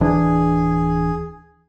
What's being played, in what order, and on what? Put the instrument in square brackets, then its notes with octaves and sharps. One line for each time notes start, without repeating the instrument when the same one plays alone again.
[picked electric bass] D1 E3 D4 [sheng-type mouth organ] G#4